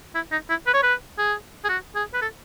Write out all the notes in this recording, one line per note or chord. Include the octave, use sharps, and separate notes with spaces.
E4
D#4
E4
B4
C#5
B4
G#4
G#4
F#4
G#4
B4
A4